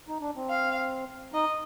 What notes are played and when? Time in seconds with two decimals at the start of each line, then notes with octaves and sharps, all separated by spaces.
0.08 D#4
0.21 D4
0.36 C4
0.49 F5
1.33 D#4 D#5